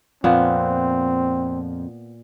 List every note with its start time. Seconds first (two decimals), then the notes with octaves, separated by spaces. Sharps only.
0.24 F2 A#2 B3 C4